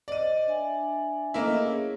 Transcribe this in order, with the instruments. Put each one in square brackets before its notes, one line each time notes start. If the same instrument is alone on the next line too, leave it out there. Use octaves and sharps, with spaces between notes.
[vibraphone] C5 D#5 [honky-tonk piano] D5 D#7
[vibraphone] D4 E5 G#5
[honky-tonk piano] A3 A#3 E4 [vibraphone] C#4 D#5 A#5
[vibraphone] G#4 C#5